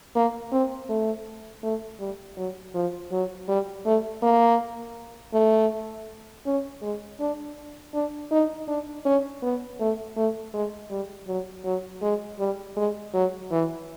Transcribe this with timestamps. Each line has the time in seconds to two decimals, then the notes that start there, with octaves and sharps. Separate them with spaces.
0.15 A#3
0.52 C4
0.89 A3
1.63 A3
2.00 G3
2.37 F#3
2.74 F3
3.12 F#3
3.48 G3
3.86 A3
4.22 A#3
5.34 A3
6.46 C#4
6.82 G#3
7.20 D4
7.94 D4
8.31 D#4
8.68 D4
9.05 C#4
9.42 B3
9.80 A3
10.17 A3
10.53 G#3
10.91 G3
11.28 F#3
11.65 F#3
12.02 G#3
12.39 G3
12.77 G#3
13.14 F#3
13.51 E3